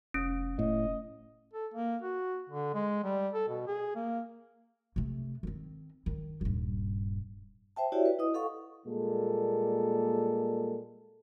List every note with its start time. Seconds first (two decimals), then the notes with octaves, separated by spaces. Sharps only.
0.14 F1 C#4
0.59 A2 D#5
1.53 A4
1.74 A#3
2.02 F#4
2.49 D3
2.74 G#3
3.04 G3
3.33 A4
3.48 B2
3.67 G#4
3.96 A#3
4.96 C3 A3
5.43 D#3 C4
6.06 D#3
6.41 D#1 G2
7.76 C5 E5 G5 A5
7.92 E4 F#4 G4 C#5 D5 E5
8.06 B4
8.19 E4 D#5 D#6
8.34 A4 F5 F#5 C#6
8.86 A#2 G3 G#3 A#3 A4